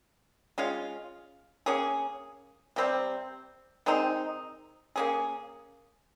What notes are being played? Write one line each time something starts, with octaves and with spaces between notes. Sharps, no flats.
G#3 C#4 F4
A#3 C#4 G#4
C3 G3 C4
D#3 G#3 C4 D#4
A#3 C#4 G#4